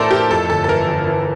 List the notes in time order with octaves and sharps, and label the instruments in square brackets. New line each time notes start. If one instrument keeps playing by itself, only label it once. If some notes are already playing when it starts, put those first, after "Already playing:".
Already playing: [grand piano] A2 E3 A3 [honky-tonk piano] A4 A#4 C5 D5
[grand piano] E4 [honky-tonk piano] G4
[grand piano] F2 [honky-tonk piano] A4
[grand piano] G1 [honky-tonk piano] A4
[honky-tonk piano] A4
[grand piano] E3 [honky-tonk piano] A#4
[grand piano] G1
E3